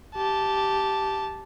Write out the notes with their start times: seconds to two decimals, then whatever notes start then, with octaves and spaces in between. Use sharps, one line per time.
0.15 G4 A5